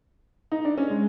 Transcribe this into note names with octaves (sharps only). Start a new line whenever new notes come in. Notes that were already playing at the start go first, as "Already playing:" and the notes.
D#4
D4
C#4
G#3